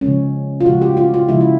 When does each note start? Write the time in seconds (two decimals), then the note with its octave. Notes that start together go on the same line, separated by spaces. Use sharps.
0.01 C#3 F3 G#3 C#4
0.61 F4
0.66 C#3 F3 G#3 F#4
0.82 G4
0.97 F4
1.14 F4
1.28 C#3 F3 G#3 E4
1.41 E4